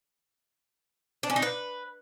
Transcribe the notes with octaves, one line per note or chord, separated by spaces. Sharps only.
D4
C#4
D#4
B4